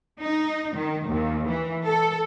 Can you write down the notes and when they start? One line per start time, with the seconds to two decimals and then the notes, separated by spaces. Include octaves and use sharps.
0.20 D#4
0.76 D#3
1.08 D#2
1.48 E3
1.85 A4